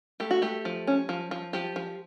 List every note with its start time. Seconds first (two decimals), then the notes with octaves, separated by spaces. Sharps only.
0.20 A3 G4
0.31 F#4
0.42 A3 G4
0.65 F3
0.87 C#4
1.09 F3
1.31 F3
1.53 F3 G4
1.76 F3